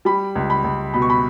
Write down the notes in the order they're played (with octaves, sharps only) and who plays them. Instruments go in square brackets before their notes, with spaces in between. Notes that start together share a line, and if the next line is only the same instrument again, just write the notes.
[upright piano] G3 B5
C#2
B5
C#2
B2 B5
C#6
B5